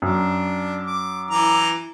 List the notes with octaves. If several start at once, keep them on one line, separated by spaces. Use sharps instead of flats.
F#2 D4
D6
E3 A#5 D6